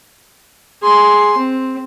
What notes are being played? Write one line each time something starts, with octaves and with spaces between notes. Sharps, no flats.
G#4 C6
C4